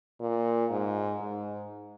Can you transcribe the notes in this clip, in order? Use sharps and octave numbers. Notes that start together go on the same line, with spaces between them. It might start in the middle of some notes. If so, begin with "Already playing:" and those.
A#2
G#2
G#2